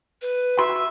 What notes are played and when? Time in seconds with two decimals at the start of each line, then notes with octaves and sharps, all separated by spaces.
0.22 B4
0.59 F#4 E5 B5 C6